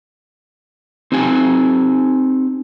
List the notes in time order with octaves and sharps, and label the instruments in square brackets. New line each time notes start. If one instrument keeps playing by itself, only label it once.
[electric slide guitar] C4 D#4 G4 G#5